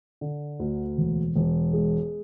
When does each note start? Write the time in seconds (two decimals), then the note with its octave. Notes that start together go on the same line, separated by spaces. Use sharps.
0.21 D3
0.59 D2
0.98 E1
1.36 E1
1.73 G#3